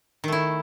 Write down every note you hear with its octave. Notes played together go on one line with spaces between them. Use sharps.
D#3 A3 E4